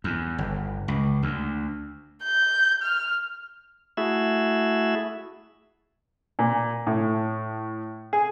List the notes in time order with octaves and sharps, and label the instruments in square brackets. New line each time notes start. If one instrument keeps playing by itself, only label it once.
[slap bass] E2
G1
C#2
D2
[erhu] G6
F6
[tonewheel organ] A3 E4 F#4 G#4 E5
[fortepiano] A#2
A2
G#4